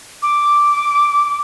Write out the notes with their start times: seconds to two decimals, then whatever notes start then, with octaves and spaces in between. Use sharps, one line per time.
0.23 D6